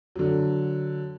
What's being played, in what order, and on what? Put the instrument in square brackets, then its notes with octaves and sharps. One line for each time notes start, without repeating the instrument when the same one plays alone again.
[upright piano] D3 F#3